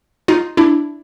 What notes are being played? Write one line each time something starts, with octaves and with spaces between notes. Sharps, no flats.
D#4 F4
D4 E4